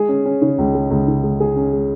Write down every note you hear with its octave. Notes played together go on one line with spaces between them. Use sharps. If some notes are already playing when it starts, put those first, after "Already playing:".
Already playing: G#3 G#4
C#4
C#4
C#3
C#2
G#3
C#2
C#3
G#3
G#3 G#4
C#4
G#3